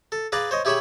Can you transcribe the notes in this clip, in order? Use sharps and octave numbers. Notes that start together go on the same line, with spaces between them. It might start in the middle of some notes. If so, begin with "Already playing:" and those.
A4
G#4 B4 D5 F5 A#5
C5 C#5 D#5
E4 G4 G#4 C#5 E5 B5